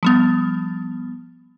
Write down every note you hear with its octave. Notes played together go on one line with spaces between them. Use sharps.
F3 G3 B3